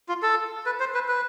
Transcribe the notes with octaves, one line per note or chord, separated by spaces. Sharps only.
F4
A4
B4
C5
B4
B4